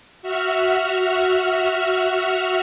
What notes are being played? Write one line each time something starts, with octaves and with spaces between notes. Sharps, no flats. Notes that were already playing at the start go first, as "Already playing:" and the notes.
F#4 E5 F6